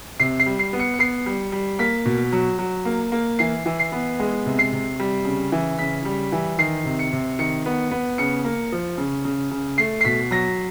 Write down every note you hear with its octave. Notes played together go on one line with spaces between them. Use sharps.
C3 C7
C7
G3
C7
B3
C#7
C#7
B3 C7
G3
G3
A#3 B6
B2
F#3
F#3
A#3
A#3
E3 C7
E3
C7
B3
G#3
C3
C7
C3
G3
C#3
E3
C#3 B6
G3
E3
D#3 C7
C3
C#7
C3
D#3 C#7
B3
B3
C#3 C#7
A#3
F3
C#3
C#3
C#3
A3 C7
C7
B2 B6
F#3 A#6